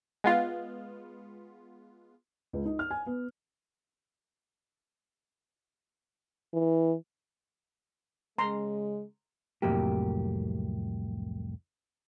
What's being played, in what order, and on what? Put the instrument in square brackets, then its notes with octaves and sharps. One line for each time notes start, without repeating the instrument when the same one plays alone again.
[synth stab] G#3 B3 F4
[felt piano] C#2
D#4
F6
G#5
B3
[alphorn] E3
[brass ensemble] C#3 G#3 [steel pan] A#5 C6
[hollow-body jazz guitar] C2 F2 A2 F#3 A#3 G4